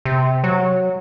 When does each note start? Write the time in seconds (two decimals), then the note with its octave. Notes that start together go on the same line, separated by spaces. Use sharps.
0.05 C3
0.44 F#3